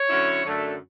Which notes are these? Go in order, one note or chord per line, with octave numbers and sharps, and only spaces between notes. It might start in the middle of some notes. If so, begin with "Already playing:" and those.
Already playing: C#5
D3 F#3 C#4 E4
F#2 D3 A3